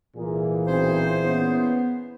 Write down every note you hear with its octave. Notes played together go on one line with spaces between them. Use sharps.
C2 A#2 E3 A#3 G#4
B1 C4 G#4 C5
A#3 B3 C#4 E4